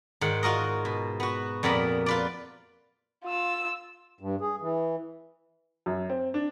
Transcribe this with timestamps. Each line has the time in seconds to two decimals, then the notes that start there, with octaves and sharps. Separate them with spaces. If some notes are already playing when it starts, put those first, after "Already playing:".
0.21 G#2 D#3 F#5
0.43 F4 F#4 A#4 D#5
0.85 B2
1.20 B3 F#4
1.63 F2 A#2 B3 A#4 B5
2.06 F4 B4 D5
3.25 F4 E6
4.21 G2
4.41 G#4
4.61 E3
5.86 F#2
6.09 C4
6.34 D4